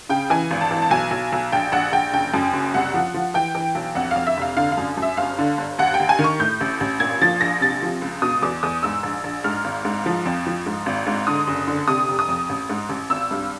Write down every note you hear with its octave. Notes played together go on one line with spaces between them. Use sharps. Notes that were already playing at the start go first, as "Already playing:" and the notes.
C#3 G5
E3 G#5
G#1
A5
E3
A5
B1 G#5
B1
B1
A#1 G5
A#1 F#5
A#1 G5
F#1 G5
F#2
F#1
C2 F#5
F3
F3
E3 G5
E3
B1
F2 F#5
F5
F2
E5
F1 F5
D3 F5
F5
F#2
F#2
E5
G1 F5
D3
G1
D#2 F#5
G5
D#2
G#5
D#3
C#6
A2 G6
A1
A1
A#2 G#6
F3 A6
A#1 A#6
C3 A6
F3
C#2
B2 D#6
E2 D6
E2 D#6
G#2 E6
A#1
A#1
G#2 F6
G#1
G#2
F3
F2
F3
G#2
G#1
G#2
D3 D#6
F#1
D3
C3 D#6
F1
D#6
F2
A1
G#2
A1
G#1 E6
G2